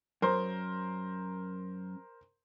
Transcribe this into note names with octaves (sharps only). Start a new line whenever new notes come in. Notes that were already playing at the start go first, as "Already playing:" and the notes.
F#2 A#4 C5 C6